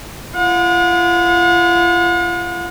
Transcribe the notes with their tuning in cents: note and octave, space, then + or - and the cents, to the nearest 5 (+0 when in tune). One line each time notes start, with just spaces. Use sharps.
F4 -40 F#5 -45